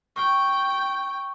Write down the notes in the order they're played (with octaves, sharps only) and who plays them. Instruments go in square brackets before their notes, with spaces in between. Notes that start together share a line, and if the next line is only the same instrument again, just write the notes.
[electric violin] G5 [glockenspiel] C#6